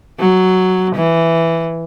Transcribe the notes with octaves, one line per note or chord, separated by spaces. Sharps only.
F#3
E3